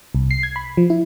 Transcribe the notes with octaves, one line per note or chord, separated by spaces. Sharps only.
C2
C7
G#6
B5
F3
E4